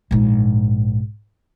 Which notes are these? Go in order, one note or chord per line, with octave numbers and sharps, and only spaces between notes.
A#1 G#2